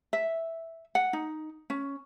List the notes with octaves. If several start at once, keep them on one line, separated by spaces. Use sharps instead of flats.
E5
F#5
D#4
C#4